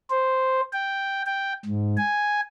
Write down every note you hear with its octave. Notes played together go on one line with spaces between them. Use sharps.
C5
G5
G5
G#2
G#5